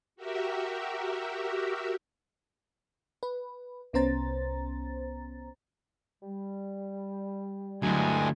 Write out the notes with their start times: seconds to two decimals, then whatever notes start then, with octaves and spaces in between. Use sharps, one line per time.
0.16 F#4 G4 A#4 E5
3.23 B4
3.93 C2 B3 C#4 C5 A#5 A6
6.23 G3
7.82 D2 G2 F#3 G#3 E4 G#5